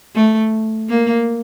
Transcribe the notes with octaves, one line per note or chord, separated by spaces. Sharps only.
A3
A#3